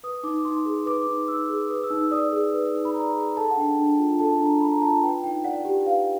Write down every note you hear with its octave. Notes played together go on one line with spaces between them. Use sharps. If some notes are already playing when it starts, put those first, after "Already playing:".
B4 D#6
D#4 D6
D#4 C6
G#4
B4 D6
D#4
D#4 E6
G#4
B4 D#6
E6
D#4
E6
D5 D#6
G#4
B4
D#4
B5
D5 A#5
G#4
A4 A5
F#5
D4 G5
D4
F4
A4 A5
D4 A#5
D4 B5
A#5
F4 A5
B4 G5
D#4 G5
D5 F#5
G4
B4 F5